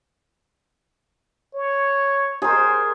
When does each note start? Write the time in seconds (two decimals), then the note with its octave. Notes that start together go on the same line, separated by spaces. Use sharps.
1.54 C#5
2.42 G#4 A#4 C5